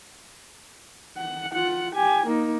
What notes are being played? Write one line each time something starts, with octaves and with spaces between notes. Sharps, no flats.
F#5
F4 F#5
G4 G#5
A#3 D#4